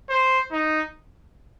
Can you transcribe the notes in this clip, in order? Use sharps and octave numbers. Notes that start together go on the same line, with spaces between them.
C5
D#4